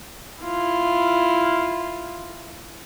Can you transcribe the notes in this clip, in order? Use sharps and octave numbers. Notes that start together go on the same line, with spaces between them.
E4 F4